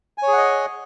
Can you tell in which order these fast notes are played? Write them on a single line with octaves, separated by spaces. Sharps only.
G#5 C#5 G#4 F#5 D#5